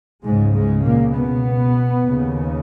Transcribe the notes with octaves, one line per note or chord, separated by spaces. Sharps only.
C#2 G#2 C#3 G#3
G#2 G#3
A#2 A#3
B2 B3
D#2 C#3